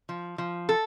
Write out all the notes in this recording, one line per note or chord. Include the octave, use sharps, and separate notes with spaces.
F3
F3
A4